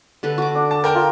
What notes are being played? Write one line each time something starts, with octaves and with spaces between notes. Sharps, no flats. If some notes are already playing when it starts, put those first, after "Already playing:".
D3 A4 B4
F#4 D6
D4
A5
A#4 G5 A#5
F4